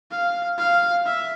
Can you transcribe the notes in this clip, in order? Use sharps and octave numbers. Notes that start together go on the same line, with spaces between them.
F5
F5
E5